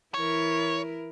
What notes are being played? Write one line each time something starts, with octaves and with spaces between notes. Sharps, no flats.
E3 E4 A#4 C#5